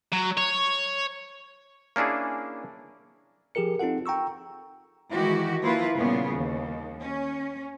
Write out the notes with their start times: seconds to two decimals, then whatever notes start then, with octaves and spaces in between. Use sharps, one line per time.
0.12 F#3
0.38 C#5
1.96 A#3 C#4 D4 E4 G#4
3.55 F3 G4 G#4 A#4 C#7
3.79 C4 D#4 F4 A4 F#5
4.06 G5 A#5 C#6 E6
5.13 D#3 E3 G#3 E4 F#4 G4
5.62 F3 A#3 E4 F4 B4
5.96 A#2 C#3 G3 B3
6.35 D#2
7.01 C#4